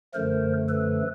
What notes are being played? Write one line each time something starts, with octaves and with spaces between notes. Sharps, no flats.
F#2 D3 F3 A3 A#4 C5
A4 B4